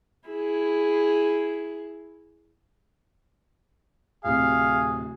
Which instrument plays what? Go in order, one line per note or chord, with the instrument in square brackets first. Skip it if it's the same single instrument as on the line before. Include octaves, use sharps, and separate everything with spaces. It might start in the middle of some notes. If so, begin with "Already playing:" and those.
[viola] E4 G#4
[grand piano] D1 C3 [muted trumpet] G#4 [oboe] F5